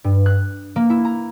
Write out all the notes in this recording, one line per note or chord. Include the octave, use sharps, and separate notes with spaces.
G2
F#6
A#3
E4
A#5